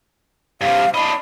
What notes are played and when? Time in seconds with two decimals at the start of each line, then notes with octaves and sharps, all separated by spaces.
0.61 G2 C3 F5
0.94 D4 D#5 B5